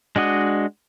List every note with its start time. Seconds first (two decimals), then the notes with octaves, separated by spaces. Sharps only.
0.16 G#3 D4 F#4 D#5